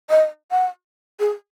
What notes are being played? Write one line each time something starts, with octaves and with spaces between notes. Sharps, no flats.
D#5
F#5
G#4